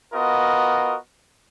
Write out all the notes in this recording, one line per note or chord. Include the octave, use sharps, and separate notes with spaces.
B3 F4 F#4 A#4 D#5